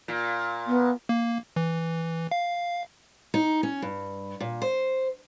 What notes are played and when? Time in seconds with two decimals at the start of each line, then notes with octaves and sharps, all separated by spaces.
0.08 A#2
0.67 B3
1.09 A#3
1.56 E3
2.31 F5
3.34 D#4
3.63 C#4
3.82 G2
4.40 A#2
4.62 C5